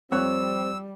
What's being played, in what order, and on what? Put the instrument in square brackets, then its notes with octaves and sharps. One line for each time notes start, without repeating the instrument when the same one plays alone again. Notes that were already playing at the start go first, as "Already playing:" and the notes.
[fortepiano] F2 C#5 F#6 [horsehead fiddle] G3 [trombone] C4 [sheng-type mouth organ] E6